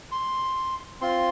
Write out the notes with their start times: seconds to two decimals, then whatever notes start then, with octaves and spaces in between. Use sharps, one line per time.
0.12 C6
1.01 C4 F4 C6